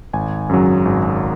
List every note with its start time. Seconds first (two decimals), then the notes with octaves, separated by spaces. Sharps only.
0.13 G#1 G#5
0.49 F#2 C#3 F#3
0.85 G#1